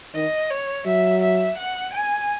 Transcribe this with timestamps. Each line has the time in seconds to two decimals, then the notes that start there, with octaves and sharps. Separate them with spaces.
0.15 D#3 D#5
0.50 C#5
0.86 F#3 E5
1.22 E5
1.57 F#5
1.94 G#5